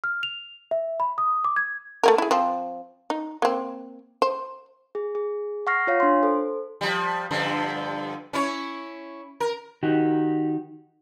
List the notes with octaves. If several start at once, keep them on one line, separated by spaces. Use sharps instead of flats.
F6
F7
E5
B5
D#6
D6
G#6
A3 A#3 A#4
E4 G#4
F3 C4
D#4
A#3 C4
C5
G#4
G#4
F#5 C#6 F6 A#6 C7
F4 C#5 F5
D4 C6
A4 C5
F3 G3
G2 D3 F3
C#4 E4 C#5
A#4
D#3 D#4 F#4 G4